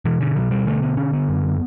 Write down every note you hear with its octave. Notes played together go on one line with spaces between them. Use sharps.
B2 E3
D3
B2 F#3
G3
D3 A3
B3
D3 C#4
B3
F#2